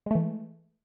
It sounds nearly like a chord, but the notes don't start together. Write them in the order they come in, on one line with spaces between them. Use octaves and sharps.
G#3 A3 E3